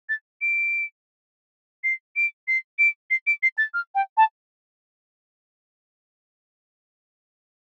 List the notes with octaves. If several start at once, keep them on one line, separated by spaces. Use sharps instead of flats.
A6
D7
C7
D7
C7
D7
C7
D7
C7
A6
F6
G5
A5